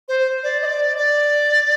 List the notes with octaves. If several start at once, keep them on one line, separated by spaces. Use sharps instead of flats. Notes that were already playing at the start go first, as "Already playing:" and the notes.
C5
D5
D#5
D5
D5